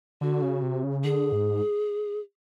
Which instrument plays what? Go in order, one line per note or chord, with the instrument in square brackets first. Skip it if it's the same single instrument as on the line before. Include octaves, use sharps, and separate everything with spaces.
[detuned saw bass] D3 [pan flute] F#4
[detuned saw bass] C#3
C3
C#3
[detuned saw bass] D3 [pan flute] G#4
[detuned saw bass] G#2